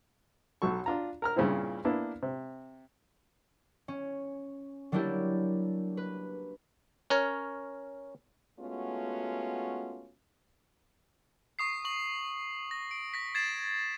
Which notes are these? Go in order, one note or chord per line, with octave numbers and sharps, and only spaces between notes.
B1 F#3 A4 C#6
D4 F4 A#5
A#4 A#5 F6
G2 A#2 C#3 G3 C4 E4
A#3 B3 D4 E4
C3
C#4
F#3 G3 A#3 D4 E4 G4
B4
C#4 A#4 C#5
G#3 A3 B3 C#4 F4 F#4
C#6 D#6 C7
C#6 F#7
A#6
D7
A#6 B6
G#6 A6 C7 E7